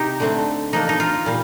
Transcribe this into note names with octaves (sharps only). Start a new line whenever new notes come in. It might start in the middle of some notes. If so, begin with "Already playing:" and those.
Already playing: C3 D#4 G4
D3 A3 C4
F3 A#3 D4 D#4
D#4
F4
A#2 G3